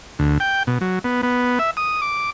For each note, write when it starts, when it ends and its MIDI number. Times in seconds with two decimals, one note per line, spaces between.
0.19 0.38 38
0.40 0.63 79
0.67 0.78 47
0.81 0.99 54
1.04 1.21 59
1.23 1.59 59
1.59 1.71 76
1.77 2.01 87
2.02 2.30 86